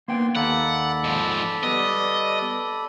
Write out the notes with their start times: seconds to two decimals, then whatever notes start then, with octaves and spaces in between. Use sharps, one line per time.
0.08 A#3 B3 G5 C6
0.36 D#2 A4 D5 F5 F#5 A#5 B5
1.04 G#2 F3
1.63 G3 B3 D#5